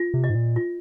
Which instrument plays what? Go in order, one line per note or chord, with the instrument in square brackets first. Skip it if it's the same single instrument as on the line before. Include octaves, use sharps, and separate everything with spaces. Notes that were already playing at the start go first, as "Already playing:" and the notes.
Already playing: [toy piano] F4
[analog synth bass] C3
[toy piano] D#5
[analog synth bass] G#2
A#2
[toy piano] F4